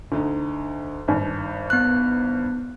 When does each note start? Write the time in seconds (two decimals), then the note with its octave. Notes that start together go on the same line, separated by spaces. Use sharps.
0.12 D2 D3 D#4
1.08 G#1 G2
1.70 B3 F#6